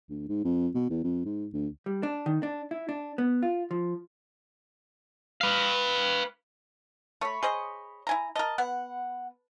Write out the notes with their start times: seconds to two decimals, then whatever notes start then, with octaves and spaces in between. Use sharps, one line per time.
0.09 D2
0.29 G#2
0.44 F2
0.74 B2
0.90 E2
1.04 F2
1.25 G#2
1.53 D2
1.86 G3
2.03 D4
2.26 D#3
2.43 D4
2.71 E4
2.89 D4
3.18 B3
3.43 F4
3.71 F3
5.41 B4 F5
7.21 A3 C#5 B5
7.43 G#4 C5 D#5
8.07 E4 G#5 A#5
8.36 A#4 D#5 A5
8.58 B3 F#5